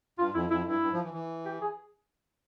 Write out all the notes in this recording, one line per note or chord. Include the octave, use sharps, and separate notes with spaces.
G2 F4
F2 E4
F2 E4
G2 E4
G2
F3
E3
E3
G4
G#4